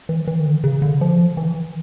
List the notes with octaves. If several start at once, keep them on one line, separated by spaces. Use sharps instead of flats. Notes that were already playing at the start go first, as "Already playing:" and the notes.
E3
E3
D#3
D3
C#3
D3
F3
E3